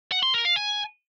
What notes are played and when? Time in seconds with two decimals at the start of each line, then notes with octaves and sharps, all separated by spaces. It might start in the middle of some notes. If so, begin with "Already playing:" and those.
0.12 F#5
0.23 C6
0.34 A#4
0.45 F5
0.56 G#5